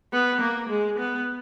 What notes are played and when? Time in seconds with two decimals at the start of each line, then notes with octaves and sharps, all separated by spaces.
0.13 B3
0.41 A#3
0.69 G#3
0.99 B3